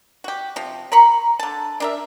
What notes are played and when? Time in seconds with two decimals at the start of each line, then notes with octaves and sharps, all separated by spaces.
0.24 F#4 G4
0.56 C3 F3
0.92 A#4 A#5 B5 C#6
1.39 D3 A5
1.80 D4 A#4 E5